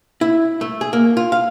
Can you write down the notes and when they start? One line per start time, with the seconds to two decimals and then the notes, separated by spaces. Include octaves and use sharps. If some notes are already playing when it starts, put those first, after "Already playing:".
0.21 E4
0.61 A3
0.81 G#4
0.93 A#3
1.17 F4
1.32 F5